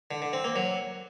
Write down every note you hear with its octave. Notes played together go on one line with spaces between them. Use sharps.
D3
D3
C4
A#3
F#3